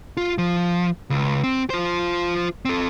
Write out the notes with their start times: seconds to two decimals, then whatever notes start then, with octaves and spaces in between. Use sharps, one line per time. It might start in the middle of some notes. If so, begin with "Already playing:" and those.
0.17 F4
0.38 F3
1.10 C#2
1.43 C4
1.70 F4 C5
2.65 C4 A4